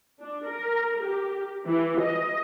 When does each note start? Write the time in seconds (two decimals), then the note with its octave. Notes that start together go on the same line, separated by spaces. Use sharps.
0.21 D4
0.50 A#4
1.06 G4
1.68 E3
2.02 D#5